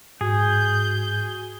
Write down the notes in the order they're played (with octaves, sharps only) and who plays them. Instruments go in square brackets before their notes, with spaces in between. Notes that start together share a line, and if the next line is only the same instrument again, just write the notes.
[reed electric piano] G#2 [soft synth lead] F#4 [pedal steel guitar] G#4 [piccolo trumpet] G6